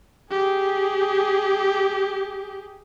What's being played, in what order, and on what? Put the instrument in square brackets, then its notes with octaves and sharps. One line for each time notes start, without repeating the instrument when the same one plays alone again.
[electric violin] G4 G#4